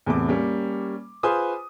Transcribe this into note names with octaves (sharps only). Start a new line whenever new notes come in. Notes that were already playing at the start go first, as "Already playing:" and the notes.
E2 A2 C3 D6
G3 A#3 C#4
F4 G#4 B4 C5 G#5 D#6